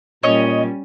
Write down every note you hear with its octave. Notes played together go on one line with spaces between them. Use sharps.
A#2 G3 C#4 C#5 D#5